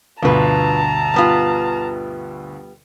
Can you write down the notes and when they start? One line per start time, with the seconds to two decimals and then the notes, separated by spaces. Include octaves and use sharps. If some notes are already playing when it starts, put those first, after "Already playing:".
0.23 D2 G2 B2 F4 B4 A5 A#5
1.14 G3 B3 F4